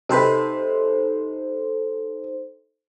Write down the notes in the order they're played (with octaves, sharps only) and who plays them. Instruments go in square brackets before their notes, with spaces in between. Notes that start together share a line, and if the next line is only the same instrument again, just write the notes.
[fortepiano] C3 B4 [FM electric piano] D#4 A4 C5